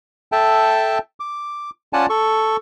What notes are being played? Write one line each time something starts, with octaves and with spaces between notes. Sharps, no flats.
A4 E5 G5 A5
D6
C#4 F4 D5 F#5 G#5 A5
A4 C#6